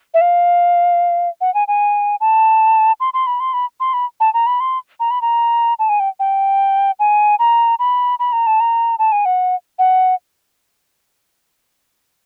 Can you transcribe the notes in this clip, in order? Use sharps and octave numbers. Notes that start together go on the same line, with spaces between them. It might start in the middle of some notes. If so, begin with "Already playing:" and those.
E5
F5
F#5
G#5
G#5
A5
C6
C6
B5
C6
B5
C6
B5
A5
A#5
B5
C6
A#5
B5
A#5
A5
G#5
G5
G5
G#5
A#5
B5
B5
A#5
A5
A#5
A5
G#5
F#5
F#5